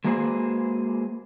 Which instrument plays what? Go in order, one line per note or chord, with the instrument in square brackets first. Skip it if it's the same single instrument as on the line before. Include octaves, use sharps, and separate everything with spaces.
[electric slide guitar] G#3 A#3 F#4 G#4 B4 C5